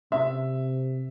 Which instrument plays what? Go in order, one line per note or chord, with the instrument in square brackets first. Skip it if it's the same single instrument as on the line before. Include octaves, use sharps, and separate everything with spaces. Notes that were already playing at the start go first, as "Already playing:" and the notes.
[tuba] C3 [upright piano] E5